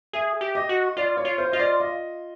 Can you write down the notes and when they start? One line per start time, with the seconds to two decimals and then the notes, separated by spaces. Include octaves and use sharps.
0.13 G#4 E5
0.41 G4
0.55 D#5
0.69 F#4
0.97 F4 D5
1.17 C#5
1.25 F4
1.38 C5
1.51 F4 D#5
1.59 D5
1.80 D#5